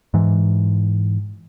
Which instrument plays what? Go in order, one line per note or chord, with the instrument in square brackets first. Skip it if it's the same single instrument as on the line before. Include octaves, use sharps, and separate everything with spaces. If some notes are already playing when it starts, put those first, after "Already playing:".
[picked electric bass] G#2 E3